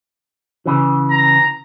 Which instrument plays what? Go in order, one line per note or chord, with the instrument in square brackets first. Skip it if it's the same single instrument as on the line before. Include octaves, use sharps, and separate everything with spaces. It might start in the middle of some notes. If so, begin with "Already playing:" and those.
[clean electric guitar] C#3 E3
[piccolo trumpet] A#5